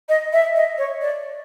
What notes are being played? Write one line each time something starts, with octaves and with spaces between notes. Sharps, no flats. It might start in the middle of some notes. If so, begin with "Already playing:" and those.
D#5
E5
D#5
C#5
D5